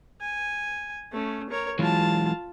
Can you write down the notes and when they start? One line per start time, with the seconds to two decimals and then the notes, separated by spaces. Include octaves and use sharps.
0.21 G#5
1.13 A3 C#4
1.50 A#4 C#5
1.79 E3 F#3 G#3 F4 A5